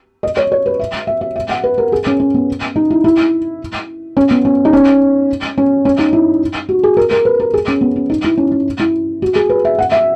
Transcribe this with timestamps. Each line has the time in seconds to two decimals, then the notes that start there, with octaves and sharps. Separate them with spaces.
0.23 D#5
0.37 C#5
0.52 C#5
0.66 B4
0.79 E5
1.07 E5
1.21 E5
1.36 E5
1.49 F#5
1.64 B4
1.78 A#4
1.92 G#4
2.07 C#4
2.20 C#4
2.34 B3
2.76 D#4
2.90 E4
3.04 E4
4.17 C#4
4.31 B3
4.45 C#4
4.65 D#4
4.73 C#4
5.58 C#4
5.85 C#4
5.99 D#4
6.13 E4
6.69 F#4
6.83 G#4
6.97 A#4
7.11 A#4
7.25 B4
7.40 A#4
7.54 G#4
7.68 C#4
7.81 B3
7.96 C#4
8.10 D#4
8.24 E4
8.37 C#4
8.52 C#4
8.80 E4
9.22 F#4
9.36 G#4
9.49 B4
9.65 E5
9.79 F#5
9.92 E5